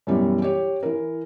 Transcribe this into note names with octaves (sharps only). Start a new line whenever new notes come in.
F#2 B2 E3 G3
G4 C#5
E3 A#4